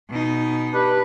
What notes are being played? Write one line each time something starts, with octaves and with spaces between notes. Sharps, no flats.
B2 D#4
D4 G4 B4